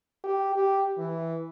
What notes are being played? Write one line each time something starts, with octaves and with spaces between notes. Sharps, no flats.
G4
G4
E3